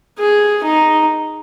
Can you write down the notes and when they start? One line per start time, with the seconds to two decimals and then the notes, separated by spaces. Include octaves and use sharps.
0.18 G#4
0.63 D#4